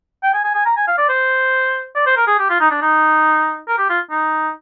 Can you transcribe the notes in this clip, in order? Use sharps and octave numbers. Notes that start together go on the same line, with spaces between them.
G5
G#5
G#5
G#5
A#5
G#5
F5
D5
C5
D5
C5
A#4
G#4
G4
F4
D#4
D4
D#4
A#4
G4
F4
D#4